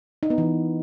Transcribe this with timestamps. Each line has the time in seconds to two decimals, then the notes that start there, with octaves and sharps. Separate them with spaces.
0.23 D#4
0.30 B3
0.38 E3